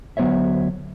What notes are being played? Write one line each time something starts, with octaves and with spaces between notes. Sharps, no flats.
D2 F#3 B3 C5 C#5 E5